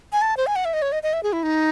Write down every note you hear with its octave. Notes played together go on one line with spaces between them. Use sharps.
G#5
A5
C5
G#5
F#5
E5
D#5
C#5
D#5
D#5
E5
G#4
E4
D#4